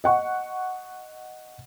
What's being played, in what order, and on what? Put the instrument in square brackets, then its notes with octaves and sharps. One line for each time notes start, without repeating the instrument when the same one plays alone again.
[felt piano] D#5 F#5 C#6